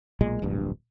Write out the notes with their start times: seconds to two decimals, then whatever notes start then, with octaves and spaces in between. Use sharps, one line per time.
0.21 B1 A#2 G#3
0.42 D1 A#1 G2